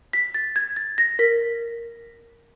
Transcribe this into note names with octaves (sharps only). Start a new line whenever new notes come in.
B6
A6
G#6
A6
A#6
A#4 B6